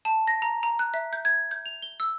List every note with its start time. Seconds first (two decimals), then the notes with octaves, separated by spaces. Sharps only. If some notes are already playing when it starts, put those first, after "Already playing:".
0.05 A5
0.27 A#6
0.42 A#5
0.63 A#5
0.79 F#6
0.94 E5
1.13 G6
1.25 G#6
1.51 G6
1.66 F7
1.82 G7
2.00 E6